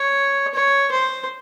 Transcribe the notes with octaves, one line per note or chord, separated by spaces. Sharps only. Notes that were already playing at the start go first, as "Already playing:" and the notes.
Already playing: C#5
C#5
C5